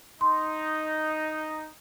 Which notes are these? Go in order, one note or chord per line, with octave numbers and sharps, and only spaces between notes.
D#4 C6